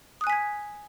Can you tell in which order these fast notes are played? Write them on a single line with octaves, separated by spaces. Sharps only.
D#6 F#6 G#5 B6 G#6